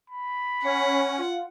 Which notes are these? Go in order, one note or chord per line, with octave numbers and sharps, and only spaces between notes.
B5
C#4 C#5 F#5
F4